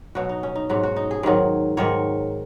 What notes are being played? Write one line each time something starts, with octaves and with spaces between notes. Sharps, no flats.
B2 F#3 F#4
D#4
C#4
D#4
G#2 F#3 F#4
F#4
D#4
G#4
G#2 D#3 F#3 G#4
G#2 D#3 F#3 C#5